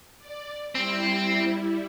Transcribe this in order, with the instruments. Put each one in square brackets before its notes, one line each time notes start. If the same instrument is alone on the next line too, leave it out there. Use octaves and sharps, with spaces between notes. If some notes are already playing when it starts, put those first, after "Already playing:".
[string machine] D5
[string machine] G3 E4 [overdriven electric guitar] C4